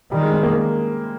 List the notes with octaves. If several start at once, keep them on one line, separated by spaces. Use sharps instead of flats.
D#3 G3
G#3
C4
A#3